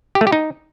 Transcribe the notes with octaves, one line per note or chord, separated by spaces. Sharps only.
G4
A3
G4
D#4